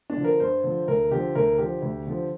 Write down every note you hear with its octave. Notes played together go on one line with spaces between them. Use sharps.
D4
D3 F3
A#4
G2 C5
D3 F3
D2 A#4
D3 F3 G4
D2 A#4
D3 F3 G4
D2
D3 F3